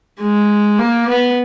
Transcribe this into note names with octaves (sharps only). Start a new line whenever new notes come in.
G#3
A#3
B3